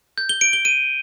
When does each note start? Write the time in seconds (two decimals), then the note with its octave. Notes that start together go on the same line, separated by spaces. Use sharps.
0.18 G6
0.29 G7
0.41 D7
0.53 G7
0.65 D#7